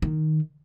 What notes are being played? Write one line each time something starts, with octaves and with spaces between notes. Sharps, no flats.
D#3